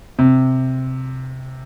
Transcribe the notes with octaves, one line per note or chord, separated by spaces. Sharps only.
C3